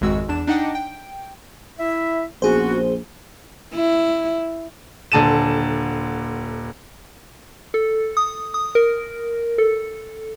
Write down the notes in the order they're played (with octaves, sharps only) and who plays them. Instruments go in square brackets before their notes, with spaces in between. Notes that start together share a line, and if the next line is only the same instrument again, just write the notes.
[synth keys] G#1 F2 G#3 F#4 E6
E2 D4 E7
D4 D#4 D#5 F#5 G5 D6
G5
[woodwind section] E4 E5
[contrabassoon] A#1 [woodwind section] B3 C#4 F#4 [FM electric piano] G#4 C5
[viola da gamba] E4
[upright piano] D#1 D3 A5 D#7 E7
[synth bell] A4
D#6
D#6
A#4
A4